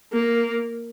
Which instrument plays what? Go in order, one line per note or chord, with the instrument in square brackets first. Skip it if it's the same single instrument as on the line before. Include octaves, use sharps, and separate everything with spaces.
[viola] A#3